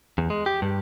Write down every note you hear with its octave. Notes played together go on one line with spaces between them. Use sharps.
E2
G#3
G4
G2